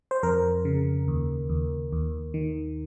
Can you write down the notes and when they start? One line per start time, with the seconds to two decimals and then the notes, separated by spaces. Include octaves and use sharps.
0.11 C5
0.23 F2 A#4
0.65 C#3
1.08 D#2
1.49 D#2
1.92 D#2
2.34 D#3